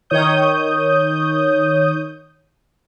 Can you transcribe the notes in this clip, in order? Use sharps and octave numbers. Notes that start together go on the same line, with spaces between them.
D#3 C#5 D#6 G6